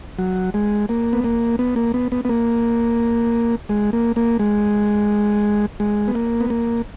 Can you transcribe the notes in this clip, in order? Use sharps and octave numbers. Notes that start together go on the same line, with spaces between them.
F#3
G#3
A#3
B3
A#3
B3
A#3
B3
B3
B3
A#3
G#3
A#3
A#3
G#3
G#3
B3
A#3
B3
A#3